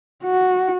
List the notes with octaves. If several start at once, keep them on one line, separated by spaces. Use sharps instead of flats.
F#4